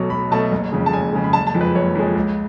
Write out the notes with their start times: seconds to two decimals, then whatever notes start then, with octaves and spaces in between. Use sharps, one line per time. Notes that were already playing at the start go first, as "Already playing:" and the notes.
Already playing: B1 B2 F#3 A3
0.10 B1 B5
0.31 B2 F#3 A3 A5
0.52 F#1
0.72 F2 C#3 G#3
0.86 A5
0.93 F#1 G#5
1.13 F2 C#3 G#3
1.24 B5
1.33 F#1 A5
1.47 A5
1.54 F2 F3 G#3
1.61 B4
1.75 F#1 C#5
1.95 F2 F3 G#3
2.15 C#2